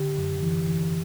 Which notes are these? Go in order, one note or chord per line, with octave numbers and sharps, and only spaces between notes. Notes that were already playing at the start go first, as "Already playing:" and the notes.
Already playing: D3 G4
F#2
E3
E3